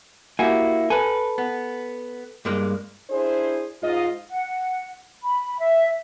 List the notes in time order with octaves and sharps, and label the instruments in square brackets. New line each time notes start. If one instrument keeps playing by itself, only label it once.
[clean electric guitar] A#3 E4 F#4 [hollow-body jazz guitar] G4 G#5
[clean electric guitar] A4 B4 [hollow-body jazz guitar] G#5
[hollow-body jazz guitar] B3
G2 G#3 A#3
[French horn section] D4 E4 G#4 C5
G#2 F4 D#5
[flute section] F#5
B5
E5